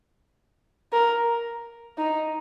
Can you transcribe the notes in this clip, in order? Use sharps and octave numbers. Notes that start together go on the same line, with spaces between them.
A#4
D#4